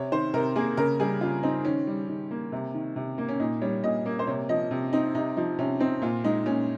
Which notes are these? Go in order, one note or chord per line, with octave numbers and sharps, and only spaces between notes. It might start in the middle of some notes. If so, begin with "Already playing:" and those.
Already playing: C3 C#5
D#3 C5
C3 A#4
A#3 G#4
C#3 A#4
G3 G#4
C#3 F4
C4 D#4
D#3 C#4
G3
D#3
A#3
C3
D#3
C3
A#3
C#4
A#2 D#4
G3 C#5
A#2 D#5
A#3
C5
C3 C#5
F3 D#5
C3
C4 D#4
C3 D#4
F3 D#4
C3 C#4
C4 D#4
A#2 F4
G#3 D#4
A#2 C#4